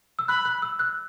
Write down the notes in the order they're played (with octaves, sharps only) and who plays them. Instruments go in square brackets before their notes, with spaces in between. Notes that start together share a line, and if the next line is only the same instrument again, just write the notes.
[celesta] E6
[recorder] B5 [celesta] F#6
[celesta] F#6
E6
F#6